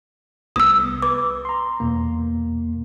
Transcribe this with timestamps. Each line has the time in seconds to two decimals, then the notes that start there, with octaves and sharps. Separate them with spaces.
0.56 C2 B3 D#6 E6
1.02 B4 D6
1.45 A#5 C6
1.80 E2 B2 A#3